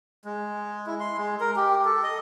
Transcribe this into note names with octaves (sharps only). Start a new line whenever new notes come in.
G#3
E4
C6
G#3
A#4
G4
A4
D#5